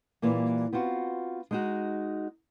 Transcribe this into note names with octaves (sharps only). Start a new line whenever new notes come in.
A#2 E3 G3 A#3
B3 C4 F4 F#4
G#3 D#4 F#4